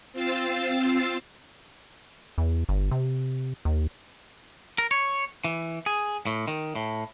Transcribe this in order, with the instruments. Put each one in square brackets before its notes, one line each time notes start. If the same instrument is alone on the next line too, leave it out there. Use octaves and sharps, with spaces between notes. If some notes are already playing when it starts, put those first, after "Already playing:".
[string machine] C4 F4 E6 A6 C7
[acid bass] E2
G1
C3
D#2
[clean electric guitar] A#4
C#5
E3
G#4
A2
D#3
A2